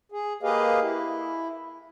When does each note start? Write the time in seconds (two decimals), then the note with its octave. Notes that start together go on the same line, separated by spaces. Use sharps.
0.12 G#4
0.43 A#3 G4 G#4 B4 D#5 F5
0.81 E4